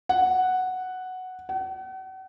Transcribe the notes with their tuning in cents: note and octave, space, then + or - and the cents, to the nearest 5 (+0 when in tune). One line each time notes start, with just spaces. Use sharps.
F#5 +0
F#5 +40